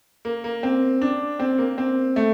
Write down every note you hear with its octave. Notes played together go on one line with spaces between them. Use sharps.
A#3
A#3
C4
D4
C4
A#3
C4
A3